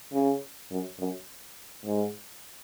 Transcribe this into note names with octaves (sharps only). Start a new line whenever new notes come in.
C#3
F#2
F#2
G#2